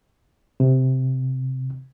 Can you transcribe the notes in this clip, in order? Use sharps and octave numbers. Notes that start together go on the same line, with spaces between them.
C3